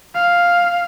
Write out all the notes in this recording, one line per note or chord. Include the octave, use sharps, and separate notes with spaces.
F5